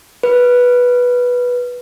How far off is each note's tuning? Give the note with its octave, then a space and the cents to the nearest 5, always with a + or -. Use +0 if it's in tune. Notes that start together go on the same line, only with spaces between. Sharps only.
B4 -10